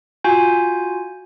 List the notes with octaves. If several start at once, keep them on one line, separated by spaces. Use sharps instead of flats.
F4 F#4 G#5 G6